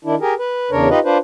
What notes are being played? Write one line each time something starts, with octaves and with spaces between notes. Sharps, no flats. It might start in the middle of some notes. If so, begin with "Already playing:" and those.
D#3 D4 E4
G4 G#4 A#4
B4
E2 C#3 D4 A#4 C#5
D#4 F4 G4 B4 D#5
D4 F4 B4 C5